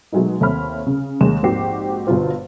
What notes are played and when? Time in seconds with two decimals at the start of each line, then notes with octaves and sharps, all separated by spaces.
0.12 B2 F#3 G#3 A3 D#4
0.41 D#2 A3 C4 C#5 B5 F6
0.87 C#3
1.21 D#2 G#3 E7
1.43 A#1 G#2 C4 F#4 G4 C7
2.07 G1 G2 B2 G3 F4 C5